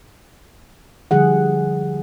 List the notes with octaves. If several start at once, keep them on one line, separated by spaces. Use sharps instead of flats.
D3 F3 G3 G#4 F#5